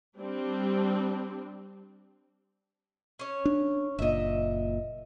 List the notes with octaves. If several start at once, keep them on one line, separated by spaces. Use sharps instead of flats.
G3 C4 D4
C#4 C#5
D4
F#1 A#2 D#5 E5